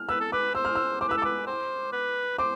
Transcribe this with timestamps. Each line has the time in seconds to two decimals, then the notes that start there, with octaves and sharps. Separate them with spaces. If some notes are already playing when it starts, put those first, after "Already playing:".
Already playing: F6
0.09 B4 E6
0.21 A4
0.32 B4 D6
0.55 C5 E6
0.65 F6
0.75 E6
1.01 C5 D6
1.09 B4 E6
1.17 A4
1.22 B4 D6
1.47 C5
1.93 B4
2.38 C5 D6